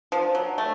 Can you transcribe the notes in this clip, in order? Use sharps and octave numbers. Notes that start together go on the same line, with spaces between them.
F3
F#3
A3